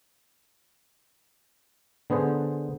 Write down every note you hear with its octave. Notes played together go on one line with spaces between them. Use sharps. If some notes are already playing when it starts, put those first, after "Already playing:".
D3 B3 G#4 C5